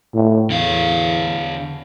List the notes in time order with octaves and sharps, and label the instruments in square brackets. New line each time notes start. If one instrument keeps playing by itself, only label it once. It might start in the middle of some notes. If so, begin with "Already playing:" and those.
[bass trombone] A2
[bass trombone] E2 [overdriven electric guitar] D3 F5